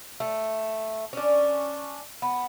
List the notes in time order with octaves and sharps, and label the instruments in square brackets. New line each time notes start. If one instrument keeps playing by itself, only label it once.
[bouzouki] A3
C#4 D4
B3